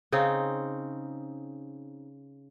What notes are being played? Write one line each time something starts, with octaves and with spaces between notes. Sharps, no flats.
C#3 C4 D#4